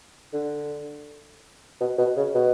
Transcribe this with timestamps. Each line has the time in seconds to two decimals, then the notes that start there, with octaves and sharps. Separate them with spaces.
0.33 D3
1.80 B2
1.98 B2
2.17 C#3
2.35 B2